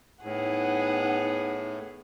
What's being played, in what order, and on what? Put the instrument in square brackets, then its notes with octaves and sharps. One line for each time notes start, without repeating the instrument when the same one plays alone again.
[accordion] A2 [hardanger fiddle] B3 G#4 [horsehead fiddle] D#4 F#5